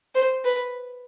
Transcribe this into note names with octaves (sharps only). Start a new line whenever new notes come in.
C5
B4